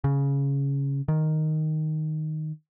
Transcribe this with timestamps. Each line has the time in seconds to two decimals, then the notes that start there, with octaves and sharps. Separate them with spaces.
0.04 C#3
1.08 D#3